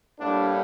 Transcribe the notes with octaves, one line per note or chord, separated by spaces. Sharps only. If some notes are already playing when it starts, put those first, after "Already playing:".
A2 G3 A#3 D4